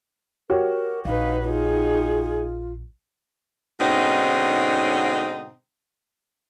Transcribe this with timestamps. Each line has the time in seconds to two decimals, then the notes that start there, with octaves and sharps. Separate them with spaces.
0.50 F#4 G4 A#4 C#5
1.05 A#1 D#4 B4 F5
1.44 D#4 F4 G#4
3.80 G#2 B2 D3 C4 C#4 D#4